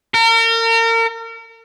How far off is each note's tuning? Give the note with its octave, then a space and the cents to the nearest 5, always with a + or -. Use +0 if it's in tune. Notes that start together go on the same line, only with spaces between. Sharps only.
A#4 -35